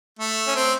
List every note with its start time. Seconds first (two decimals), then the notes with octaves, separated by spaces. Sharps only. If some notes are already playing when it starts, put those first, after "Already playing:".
0.19 A3
0.47 C#4
0.55 C4